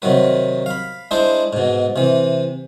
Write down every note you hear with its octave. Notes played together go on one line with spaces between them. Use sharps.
C3 D#3 F#3 B4
F5 B5
G#3 D4 E4 C5 D5
G#2 B2
C3 E3